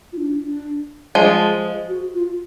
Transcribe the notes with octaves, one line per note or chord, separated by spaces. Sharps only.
F4
D4
D4
F3 G#3 G#4
F#4
F4